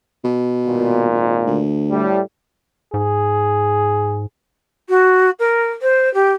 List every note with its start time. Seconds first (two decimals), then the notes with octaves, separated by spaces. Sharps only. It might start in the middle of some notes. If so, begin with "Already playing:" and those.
0.24 B2
0.66 G#1 A#2
1.46 D2
1.91 A2 G3
2.94 G#2 G#4
4.89 F#4
5.39 A#4
5.82 C5
6.14 G4